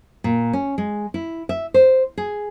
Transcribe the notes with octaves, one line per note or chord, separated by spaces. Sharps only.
A#2
C#4
G#3
E4
E5
C5
G#4